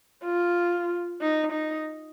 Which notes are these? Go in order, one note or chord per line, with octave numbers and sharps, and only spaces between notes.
F4
D#4
D#4